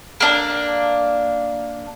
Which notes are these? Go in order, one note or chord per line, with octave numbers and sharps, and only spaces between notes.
A#3 D4